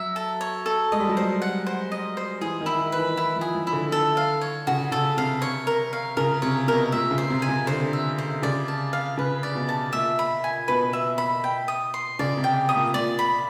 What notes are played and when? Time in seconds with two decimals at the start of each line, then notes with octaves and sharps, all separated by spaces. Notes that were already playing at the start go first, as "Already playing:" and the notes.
Already playing: F#3 E5
0.16 A4
0.41 C#5
0.66 A4
0.92 G#3 D#5
1.00 G3
1.09 F#3
1.17 G3 C5
1.42 F#5
1.66 C5
1.92 D#5
2.17 C5
2.41 E3 G#4
2.61 D#3
2.66 E4
2.79 D#3
2.92 B4
2.98 E3
3.17 E4
3.36 F3
3.41 G#4
3.55 F3
3.67 E4
3.73 D3
3.92 A4
4.17 F5
4.41 C#5
4.67 C#3 F#4
4.92 C#3 A4
5.17 C3 F5
5.42 C#5
5.67 A#4
5.93 F5
6.17 C#3 A#4
6.42 C3 C#5
6.67 B2 A#4
6.92 A#2 E5
7.11 C#3
7.18 C5
7.30 C3
7.42 G#5
7.49 C3
7.67 D3 C5
7.93 E5
8.18 C5
8.42 C#3 D5
8.68 A5
8.93 F5
9.17 C#3 B4
9.43 D5
9.55 B2
9.69 A5
9.93 A#2 E5
10.19 B5
10.44 G#5
10.68 B2 B4
10.93 E5
11.18 B5
11.44 G5
11.68 D#6
11.94 C6
12.19 C#3 D5
12.37 C3
12.44 G5
12.69 D#6
12.76 A#2
12.94 A#2 D5
13.19 B5